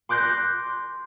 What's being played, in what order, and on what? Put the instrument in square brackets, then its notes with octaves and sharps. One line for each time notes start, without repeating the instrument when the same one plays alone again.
[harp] C6 D6 F#6 G6 A#6 C7